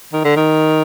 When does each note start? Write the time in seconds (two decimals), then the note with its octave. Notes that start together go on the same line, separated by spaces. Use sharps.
0.13 D#3
0.25 D3
0.36 D#3